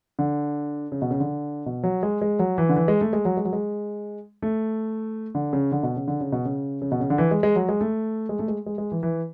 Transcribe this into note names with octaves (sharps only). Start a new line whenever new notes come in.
D3
C#3
B2
C#3
D3
B2
F#3
G#3
G#3
F#3
E3
D3
E3
G#3
A3
G#3
F#3
G#3
F#3
G#3
A3
D3
C#3
D3
B2
C#3
D3
C#3
B2
C#3
C#3
B2
C#3
D3
E3
G#3
G#3
F#3
G#3
A3
G#3
A3
G#3
G#3
G#3
E3
E3